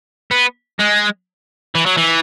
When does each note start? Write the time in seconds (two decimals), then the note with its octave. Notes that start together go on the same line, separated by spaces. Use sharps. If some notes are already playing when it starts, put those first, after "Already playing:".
0.31 B3
0.79 G#3
1.75 E3
1.86 F#3
1.97 E3